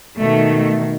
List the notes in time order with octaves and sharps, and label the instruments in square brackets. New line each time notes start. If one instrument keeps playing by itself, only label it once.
[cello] B2 D#3 [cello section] A3